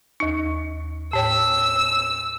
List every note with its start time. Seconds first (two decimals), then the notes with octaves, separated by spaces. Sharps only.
0.20 D#2 D#4
1.13 A2 C#5 G5 E6